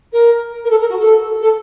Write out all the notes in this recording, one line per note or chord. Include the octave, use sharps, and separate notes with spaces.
A#4
A#4
A4
A#4
F#4
A4
A4